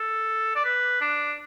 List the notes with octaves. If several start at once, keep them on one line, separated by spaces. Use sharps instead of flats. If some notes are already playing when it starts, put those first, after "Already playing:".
Already playing: A4
D5
B4
D4